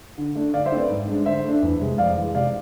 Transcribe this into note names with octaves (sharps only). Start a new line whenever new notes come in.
D3
A3 D4
D3 D5 F5
C5 E5
A3 C4
B4 D5
G#2
G#3 D4
D3 C5 E5
A3 D4
E2
C3 G#3
F2 D5 F5
E3 G#3
C3 D5 F5